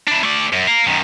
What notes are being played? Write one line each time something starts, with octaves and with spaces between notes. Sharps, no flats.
D4 E4
A3 D5
F#2
F5 A#5
F#2 D#3